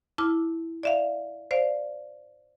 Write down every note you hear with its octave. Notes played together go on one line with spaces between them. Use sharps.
E4 A5 D6 F6
D5 E5 F5
C5 D5 F5